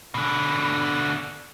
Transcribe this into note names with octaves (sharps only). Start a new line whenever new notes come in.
B2 D3